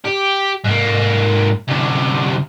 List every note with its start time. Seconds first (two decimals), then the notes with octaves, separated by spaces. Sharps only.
0.05 G4
0.64 G#2 A#3
1.68 D2 C3